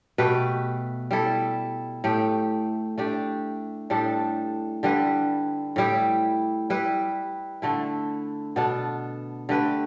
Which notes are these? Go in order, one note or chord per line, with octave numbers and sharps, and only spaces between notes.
B2 A3 G4 B4
G3 E4 A4
A2 A3 G4
A3 D4 G4
A2 G3 D4 A4
D3 G3 E4 B4
A2 G3 E4 G4
G3 E4 B4
D3 A3 E4
B2 B3 D4 A4
D3 A3 G4 B4